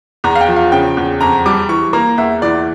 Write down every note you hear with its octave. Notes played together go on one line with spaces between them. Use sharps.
E2 A#5
F5
G5
F3
F5
C#3 G5
E2
F2 A#5
G3 D6
E3 C#6
A#3 A#5
E2 E5
E3 D5